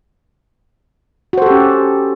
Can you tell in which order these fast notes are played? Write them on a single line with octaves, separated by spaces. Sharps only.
F#4 C5 A4 G4 C#4